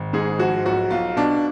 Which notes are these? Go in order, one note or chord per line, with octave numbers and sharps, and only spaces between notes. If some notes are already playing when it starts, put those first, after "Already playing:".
Already playing: G#1
G#2 G#4
F3 F#4
B1 F#4
B1 F4
B2 D4